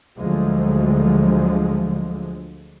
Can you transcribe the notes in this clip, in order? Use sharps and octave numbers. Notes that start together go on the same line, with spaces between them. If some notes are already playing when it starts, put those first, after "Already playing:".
D2 D3 F3 F#3 G#3